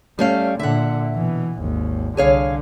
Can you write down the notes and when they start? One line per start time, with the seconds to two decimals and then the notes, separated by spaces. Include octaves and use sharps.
0.19 G3 A3 C#4 F5
0.59 A#2 D3 E5 F#5
1.14 B2 E3
1.60 G#1 D#2
2.17 C2 D3 G#4 C#5 F5